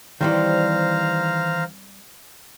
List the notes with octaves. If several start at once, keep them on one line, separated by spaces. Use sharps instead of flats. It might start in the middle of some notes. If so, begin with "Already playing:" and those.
D#3 E3 G3 C4 C5 F5 A#5